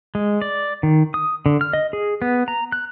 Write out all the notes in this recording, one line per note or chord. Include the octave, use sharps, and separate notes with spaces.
G#3
D5
D#3
D#6
D3
F6
D#5
G#4
B3
A#5
F#6